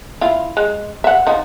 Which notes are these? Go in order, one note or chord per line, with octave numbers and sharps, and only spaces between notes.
E4 F4
G#3
E5 F#5
F3 D#4